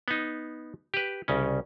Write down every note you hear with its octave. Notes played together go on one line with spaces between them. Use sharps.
B3 D#4
G4 B4
C2 C#3 C#4